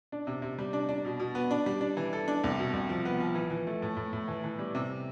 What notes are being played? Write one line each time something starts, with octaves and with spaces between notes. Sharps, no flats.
D4
C3
C3
G3
D4
D4
B2
B2
B3
D4
G3
D4
E3
A4
D4
C2
B2
C2
F3
B3
F3
E3
E3
A3
A2
A2
A2
E3
E3
G3
C3